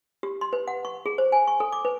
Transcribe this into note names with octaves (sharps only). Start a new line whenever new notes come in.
G4
C6
B4
F#5
C#6
G#4
C5
G#5
C#6
A4
D6
B4